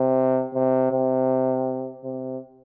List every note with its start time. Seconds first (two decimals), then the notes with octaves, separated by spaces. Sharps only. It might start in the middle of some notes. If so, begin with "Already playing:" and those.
Already playing: C3
0.54 C3
0.92 C3
2.04 C3